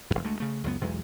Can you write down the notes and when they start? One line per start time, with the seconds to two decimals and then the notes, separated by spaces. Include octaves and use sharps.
0.10 E1 F#2
0.23 D2 G#3 A3
0.40 C#3 A3
0.64 C#2 F#2 B3
0.81 B1 E2 G#3